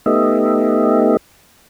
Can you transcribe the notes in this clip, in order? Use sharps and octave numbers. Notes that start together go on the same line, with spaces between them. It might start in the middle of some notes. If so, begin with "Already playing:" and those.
A3 B3 D#4 G4 D#5 E5